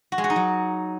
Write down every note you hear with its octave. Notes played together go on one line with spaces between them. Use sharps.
F#4
G#3
F#4
D#4
F#3